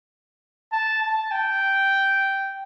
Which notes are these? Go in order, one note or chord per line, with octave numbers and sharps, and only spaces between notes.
A5
A5
G5